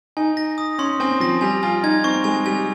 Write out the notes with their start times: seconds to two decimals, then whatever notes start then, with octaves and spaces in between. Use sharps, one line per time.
0.17 D#4 G#5
0.37 A#6
0.58 D#6
0.79 C#4 C6
1.00 C4 G#5
1.20 F3 A#6
1.41 G3 G#5
1.63 F4 G#5
1.83 D#4 G#6
2.04 C4 C#6
2.24 G#3 G#5
2.46 G3 G#5